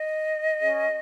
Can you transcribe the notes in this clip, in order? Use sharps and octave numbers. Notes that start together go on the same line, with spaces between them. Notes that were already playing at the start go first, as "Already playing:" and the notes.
Already playing: D#5
C#4 G#4 C#5